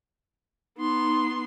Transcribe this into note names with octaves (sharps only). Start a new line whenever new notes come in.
B3 D#4 C6